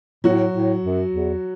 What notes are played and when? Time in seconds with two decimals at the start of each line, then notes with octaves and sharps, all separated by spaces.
0.24 A2 F#3 F#4
0.54 A2
0.82 F#2
1.13 E2